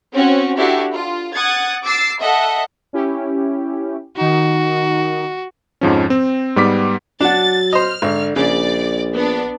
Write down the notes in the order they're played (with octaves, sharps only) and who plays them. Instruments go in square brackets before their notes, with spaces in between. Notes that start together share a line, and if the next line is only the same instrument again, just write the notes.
[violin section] C4 C#4 F#4 C#5
D4 E4 F#4 G4 A4
F4
F#5 D#6 G#6 A6
D6 E6 A6 C7
A4 D#5 E5 F#5
[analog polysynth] C#4 E4 G4
[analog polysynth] D#3 D#4 [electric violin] F#4
[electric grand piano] F2 G#2 F3 C#4
C4
G#2 G3 B3 D6 B6
[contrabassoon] F#3 [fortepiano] D4 F#4 [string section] A6
[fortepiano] C5 D#5 [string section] F6
[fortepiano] G#1 [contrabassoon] D3
[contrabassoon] A#1 [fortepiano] C#3 [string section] D5
[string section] B3 D4